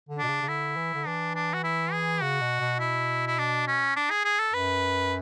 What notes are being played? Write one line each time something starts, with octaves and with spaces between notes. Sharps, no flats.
D3
B2 D4
C#3
C#3
D3 E4
E3
D3
E3 D4
D4
F#4
E4
G#4
C#3 F#4
B2
B2
E4
E4
D4
C#4
D4
G#4
G#4
A4
F#2 B4